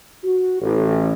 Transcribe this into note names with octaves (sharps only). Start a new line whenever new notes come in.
F#4
A1